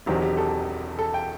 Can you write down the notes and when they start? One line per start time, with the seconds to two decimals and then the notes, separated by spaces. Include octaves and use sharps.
0.06 E1 E2 D#3 F#3 C4 G4
0.22 G4
0.37 A4
0.99 A4
1.14 G5